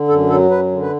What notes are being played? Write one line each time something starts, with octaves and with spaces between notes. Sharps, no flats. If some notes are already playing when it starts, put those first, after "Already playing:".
Already playing: D3
F#2 A4
F#3 A4
F#2 B4
D3
B4